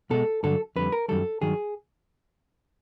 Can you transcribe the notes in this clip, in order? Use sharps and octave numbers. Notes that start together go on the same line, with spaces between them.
B2 G#3 A4
G2 D3 F#3 A4
F2 D3 G3 B4
A#4
F#2 D#3 G3 A4
G2 D#3 F#3 G#4